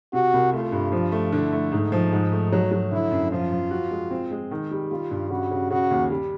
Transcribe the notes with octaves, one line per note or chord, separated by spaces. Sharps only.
C3 F#4
C2
A3 F4
G2
F3 F4
A3
D3 E4
A3
G#2 D#4
F3
G#2
A3
F#3
F#3
D3 E4
F#2
F3 F4
F3
F#4
G#3
C4
G#3
D#3
G3
G3 F4
G2
C#3 F#4
C#3
C#3 F#4
D#2
G3